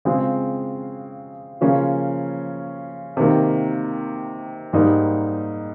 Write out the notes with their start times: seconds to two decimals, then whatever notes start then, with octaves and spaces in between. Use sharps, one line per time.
0.05 C#3 G#3 C4 F4 G#4
1.61 C#3 F3 A#3 C#4 F4
3.17 C3 D#3 A#3
4.73 G#2 G3 A#3 D#4